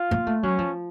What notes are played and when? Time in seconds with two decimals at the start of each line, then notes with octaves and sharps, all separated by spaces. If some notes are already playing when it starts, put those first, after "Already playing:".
Already playing: F4
0.11 A#3
0.27 A3
0.43 F#3 C#4
0.58 F3